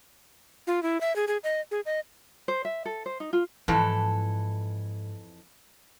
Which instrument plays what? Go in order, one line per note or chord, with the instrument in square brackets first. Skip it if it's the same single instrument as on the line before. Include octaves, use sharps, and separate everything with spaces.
[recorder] F4
E4
E5
G#4
G#4
D#5
G#4
D#5
[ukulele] C5
E5
A4
C5
D#4
F4
[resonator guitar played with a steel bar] F2 E3 A4 [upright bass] G#2